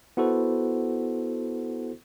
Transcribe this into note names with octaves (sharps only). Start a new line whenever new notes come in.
B3 E4 F#4 A4 C5